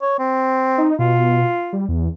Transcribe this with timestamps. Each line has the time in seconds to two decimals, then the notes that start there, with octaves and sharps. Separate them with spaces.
0.02 C#5
0.19 C4
0.78 D#4
0.99 B2 F4
1.73 G3
1.89 E2